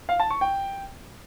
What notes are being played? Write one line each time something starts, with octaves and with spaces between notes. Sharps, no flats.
F5
A5
C#6
G5